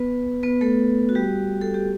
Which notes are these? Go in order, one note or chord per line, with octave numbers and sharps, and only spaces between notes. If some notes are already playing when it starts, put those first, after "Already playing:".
Already playing: B3 B4
B3 B4
A3 A4
F#4
G3 G4
A4
G4